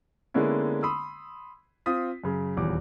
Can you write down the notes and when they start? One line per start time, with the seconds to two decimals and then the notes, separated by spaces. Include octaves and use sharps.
0.34 D3 G#3 A#3 B3 C#4 E4
0.83 B5 C6 D#6 E6
1.86 C4 F4 D#6 B6
2.24 F#2 C#3
2.57 D#1 E2 D6